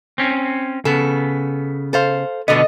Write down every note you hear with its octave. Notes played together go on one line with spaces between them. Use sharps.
C4 C#4
C#3 B3 A4
A4 C5 F5
B2 D3 B3 A4 D#5